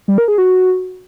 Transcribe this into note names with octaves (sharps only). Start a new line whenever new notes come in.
G3
A#4
G#4
F#4